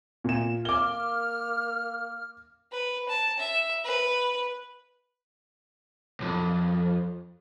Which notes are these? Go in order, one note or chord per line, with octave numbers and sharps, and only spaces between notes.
A#2 E7
A#3 D6 F6 G7
B4
A5
E5
B4
B1 F2